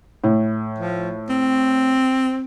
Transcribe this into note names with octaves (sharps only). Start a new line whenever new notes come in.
A2
F3
C4